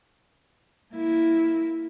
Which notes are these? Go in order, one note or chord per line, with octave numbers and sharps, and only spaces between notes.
A#3 E4